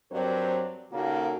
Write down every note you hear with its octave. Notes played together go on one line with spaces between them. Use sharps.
G2 F#3 C4 A#4 C5 D5
A#2 C#3 A#3 D#4 F#4 A4